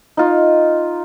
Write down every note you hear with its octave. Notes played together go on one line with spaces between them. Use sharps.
D#4 F4